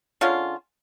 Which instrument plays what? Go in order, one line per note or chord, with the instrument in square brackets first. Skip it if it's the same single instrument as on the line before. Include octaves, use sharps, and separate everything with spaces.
[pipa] D3 G#3 C#4 F4